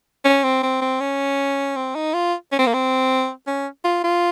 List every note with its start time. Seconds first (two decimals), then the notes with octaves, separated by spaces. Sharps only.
0.25 C#4
0.44 C4
0.63 C4
0.81 C4
1.01 C#4
1.76 C4
1.95 D#4
2.14 F4
2.52 C#4
2.59 C4
2.66 A#3
2.74 C4
3.47 C#4
3.84 F4
4.04 F4